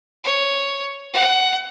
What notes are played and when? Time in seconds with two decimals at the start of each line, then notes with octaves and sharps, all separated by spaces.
0.24 C#5
1.13 F#5